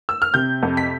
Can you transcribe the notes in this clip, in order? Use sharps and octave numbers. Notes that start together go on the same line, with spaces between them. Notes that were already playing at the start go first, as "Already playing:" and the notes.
E6
F6
C3 G6
F2
B6